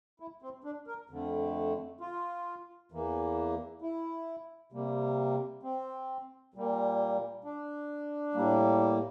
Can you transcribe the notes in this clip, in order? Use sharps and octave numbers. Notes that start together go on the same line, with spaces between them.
E4
C4
D4
A#4
F2 D3 A3
F4
E2 E3 A#3
E4
C3 G3 A#3
C4
A#2 G3 A#3
D4
A2 G3 A#3